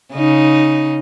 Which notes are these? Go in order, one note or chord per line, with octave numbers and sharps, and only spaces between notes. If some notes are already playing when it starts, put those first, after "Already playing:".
C#3 D#4